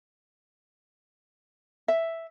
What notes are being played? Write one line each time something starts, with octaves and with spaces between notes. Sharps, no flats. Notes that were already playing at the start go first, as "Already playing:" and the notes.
E5